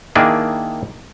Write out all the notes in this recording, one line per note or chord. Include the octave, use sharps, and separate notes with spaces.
D#3 A#3 D4 E4 G#4